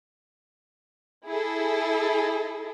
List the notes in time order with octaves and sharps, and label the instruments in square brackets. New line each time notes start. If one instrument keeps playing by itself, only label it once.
[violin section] E4 G#4 A4